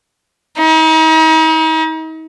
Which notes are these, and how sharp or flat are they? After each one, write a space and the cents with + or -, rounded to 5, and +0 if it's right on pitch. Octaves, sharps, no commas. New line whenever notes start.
D#4 +40